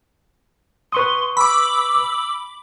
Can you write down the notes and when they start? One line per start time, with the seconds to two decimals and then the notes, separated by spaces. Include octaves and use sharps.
0.92 B4 C6 C#6 D#6
1.37 B5 D6 E6